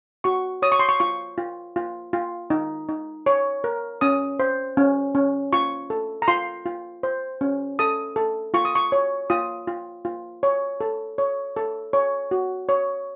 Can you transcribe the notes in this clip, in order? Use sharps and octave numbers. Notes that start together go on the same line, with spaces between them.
F#4 C#6
C#5 D#6
C#6
C6
C#6
F4 C#6
F4
F4
F4
D#4
D#4
C#5
A#4
C#4 D#6
C5
C#4
C#4
F4 C#6
A4
A#5
F4 C6
F4
C5
C#4
A4 D#6
A4
F4 C#6
D#6
C#6
C#5
F4 D#6
F4
F4
C#5
A4
C#5
A4
C#5
F#4
C#5